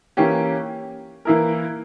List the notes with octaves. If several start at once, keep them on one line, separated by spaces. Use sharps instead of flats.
E3 A#3 C#4 G4
E3 A#3 E4 A#4